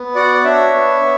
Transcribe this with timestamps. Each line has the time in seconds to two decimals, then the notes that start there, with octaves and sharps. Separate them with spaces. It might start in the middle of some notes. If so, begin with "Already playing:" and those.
Already playing: B3
0.15 F#4 D5 F#5
0.34 D5
0.44 D4 C#5 E5
0.74 B3
1.03 B3